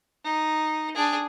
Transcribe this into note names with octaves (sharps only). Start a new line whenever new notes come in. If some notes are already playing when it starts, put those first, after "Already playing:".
D#4
D4 G#4